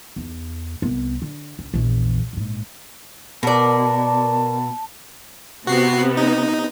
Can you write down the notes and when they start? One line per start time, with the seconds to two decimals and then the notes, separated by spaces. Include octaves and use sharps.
0.16 E2 D#4
0.82 C2 B3
1.22 D3
1.59 C#2
1.74 A#1 E2
2.33 A#1 G#2
3.43 B2 A#4 D5 A5
5.67 C3 B3 F#4 C7
6.17 D#4